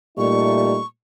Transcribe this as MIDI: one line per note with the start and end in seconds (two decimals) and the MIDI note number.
0.18 0.80 46
0.18 0.78 55
0.18 0.78 57
0.18 0.78 63
0.18 0.86 85